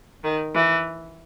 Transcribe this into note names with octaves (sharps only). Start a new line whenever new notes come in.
D#3
E3